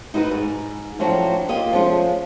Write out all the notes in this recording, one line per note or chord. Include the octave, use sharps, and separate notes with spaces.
D#4 E4 F#4 A#4 B4
G#2
A2 F3 F#3 C#4 D4 F#4
A#3 F4 G4 D#5
F3 G#3 A3 C#4 F4